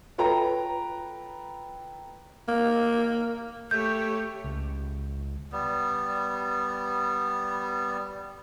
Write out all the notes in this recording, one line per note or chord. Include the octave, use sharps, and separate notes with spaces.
F4 A4 B4 C#5 G5 A#5
A#3
A3 G4 C#5 G6
C#2
G3 B3